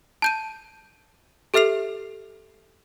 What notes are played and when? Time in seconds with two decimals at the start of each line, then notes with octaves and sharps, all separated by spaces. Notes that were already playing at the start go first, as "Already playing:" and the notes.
0.22 A5 G6 D#7
1.54 G4 A4 E5 F6 C7 F7